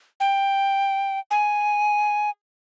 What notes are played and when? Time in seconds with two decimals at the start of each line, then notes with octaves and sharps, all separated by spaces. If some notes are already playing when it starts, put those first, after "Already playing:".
0.20 G5
1.31 G#5